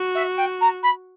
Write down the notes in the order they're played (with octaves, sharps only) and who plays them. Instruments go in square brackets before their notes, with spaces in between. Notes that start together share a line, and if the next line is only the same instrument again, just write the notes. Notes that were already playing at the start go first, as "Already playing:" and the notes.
Already playing: [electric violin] F#4
[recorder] E5
G5
A#5
B5